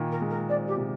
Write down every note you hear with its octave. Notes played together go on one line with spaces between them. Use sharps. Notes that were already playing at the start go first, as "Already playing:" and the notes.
Already playing: A#2 D#3
A#4
G#3
A#4
C4 D5
G4
C3